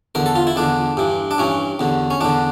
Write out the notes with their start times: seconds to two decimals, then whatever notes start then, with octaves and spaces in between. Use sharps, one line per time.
0.15 E2 D3 A#4
0.26 A4
0.36 F4
0.47 E4
0.56 E2 D3 D4
0.97 G2 E3
1.31 D4
1.38 G2 E3 C#4
1.79 E2 D3
2.10 C#4
2.21 E2 D3 D4